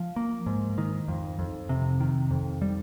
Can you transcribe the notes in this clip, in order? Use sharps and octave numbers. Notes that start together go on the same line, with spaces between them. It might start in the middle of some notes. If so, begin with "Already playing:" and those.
Already playing: F3
A#3
G#2
D#3
F2
F2
C3
D#3
F2
G3